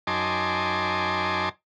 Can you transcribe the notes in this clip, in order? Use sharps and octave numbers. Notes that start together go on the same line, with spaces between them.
F#2 D#4 G#5 A5 C6 D6